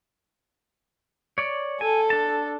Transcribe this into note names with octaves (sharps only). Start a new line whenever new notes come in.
C#5 D5
A4 G#5
D4 A5